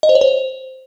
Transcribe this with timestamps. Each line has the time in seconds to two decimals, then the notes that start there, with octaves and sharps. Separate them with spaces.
0.03 D#5
0.09 C5
0.15 C#5
0.21 C5